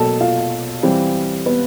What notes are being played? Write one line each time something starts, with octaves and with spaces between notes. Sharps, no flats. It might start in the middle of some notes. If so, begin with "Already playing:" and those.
Already playing: B2 F#3 A#3 A4 A5
F4 F5
E3 G3 C4
B3 B4